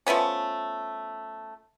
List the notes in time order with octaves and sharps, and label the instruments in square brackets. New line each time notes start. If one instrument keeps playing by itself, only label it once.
[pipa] F3 A3 B3 C#4